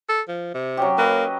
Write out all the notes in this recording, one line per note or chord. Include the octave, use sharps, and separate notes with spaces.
A4
F3
C3
F#3 C#4 G4
A#3 B4 D#5